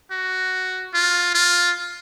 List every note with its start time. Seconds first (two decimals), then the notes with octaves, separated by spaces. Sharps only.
0.11 F#4
0.94 F4
1.34 F4